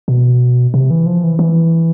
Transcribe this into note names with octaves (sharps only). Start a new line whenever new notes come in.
B2
C3
E3
F3
E3
E3